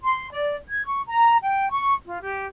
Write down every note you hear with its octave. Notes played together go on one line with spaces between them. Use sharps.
C6
D5
G#6
C#6
A#5
G5
C#6
F4
G4